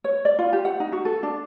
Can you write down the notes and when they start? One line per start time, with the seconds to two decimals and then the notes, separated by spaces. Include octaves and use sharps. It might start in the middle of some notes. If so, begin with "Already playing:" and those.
0.04 C#5
0.25 D5
0.39 F4
0.53 G4
0.65 F#5
0.80 D#4
0.92 F#4
1.05 A4
1.23 D4